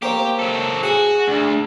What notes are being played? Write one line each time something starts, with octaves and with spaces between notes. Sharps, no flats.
A#3 C4 G4 C#5
F#3 A4
F#4 G#4
D2